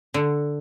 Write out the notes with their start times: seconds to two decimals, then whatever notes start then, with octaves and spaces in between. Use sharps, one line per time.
0.14 D3